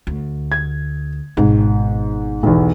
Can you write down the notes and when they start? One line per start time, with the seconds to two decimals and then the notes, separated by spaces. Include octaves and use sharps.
0.07 D2
0.52 G#6
1.37 G#1 G#2 B2
2.43 B1 E2